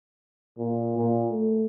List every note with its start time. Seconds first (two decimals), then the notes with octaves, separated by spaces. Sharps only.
0.58 A#2
0.98 A#2
1.29 A3